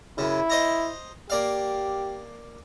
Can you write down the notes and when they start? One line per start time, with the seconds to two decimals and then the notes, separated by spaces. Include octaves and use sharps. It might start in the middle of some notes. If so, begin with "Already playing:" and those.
0.18 F#2 C#3 E4
0.50 C5 D#5 A#5
1.30 A#3 G4 D5 F5